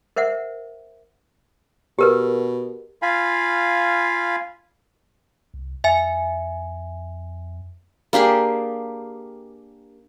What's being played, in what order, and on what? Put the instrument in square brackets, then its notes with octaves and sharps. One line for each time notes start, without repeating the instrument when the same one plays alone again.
[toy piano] A#4 C5 E5 F#5
[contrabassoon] B2 [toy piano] G4 A#4 B4
[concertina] F4 F5 G#5 B5
[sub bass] C2
[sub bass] F2 [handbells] E5 G#5
[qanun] A#3 D4 G4 G#4